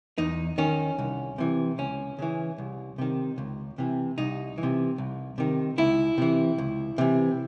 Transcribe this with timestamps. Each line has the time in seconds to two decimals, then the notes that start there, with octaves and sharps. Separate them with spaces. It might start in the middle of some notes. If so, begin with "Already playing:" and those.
0.18 E2 D#4
0.58 D#3 C#4
0.99 C2
1.38 C3 E3
1.78 C#2 C#4
2.19 C#3 E3
2.58 C2
2.98 C3 D#3
3.38 C#2
3.78 C3 E3
4.18 C2 D#4
4.58 E3
4.63 C3
4.98 C2
5.38 C3 D#3
5.78 C#2 E4
6.18 C3 E3
6.58 C#2
6.98 C3 E3